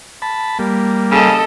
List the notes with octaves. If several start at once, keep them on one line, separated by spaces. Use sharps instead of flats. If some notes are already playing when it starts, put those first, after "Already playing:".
A5 B5
G3 A#3
C#3 A4 D#5